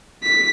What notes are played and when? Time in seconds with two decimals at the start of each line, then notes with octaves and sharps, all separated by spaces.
0.23 B6